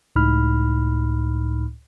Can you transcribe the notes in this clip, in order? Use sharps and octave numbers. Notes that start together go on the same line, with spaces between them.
C#2 A2 D#4 B5 F6